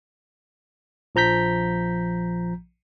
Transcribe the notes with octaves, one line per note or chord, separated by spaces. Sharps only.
A#1 F3 A#5 G6 B6